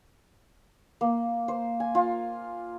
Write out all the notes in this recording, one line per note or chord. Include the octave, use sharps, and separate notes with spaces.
A#3
C5
G#5
F4